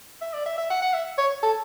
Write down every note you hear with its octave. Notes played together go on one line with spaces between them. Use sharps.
E5
D5
E5
E5
F#5
F#5
E5
C#5
A4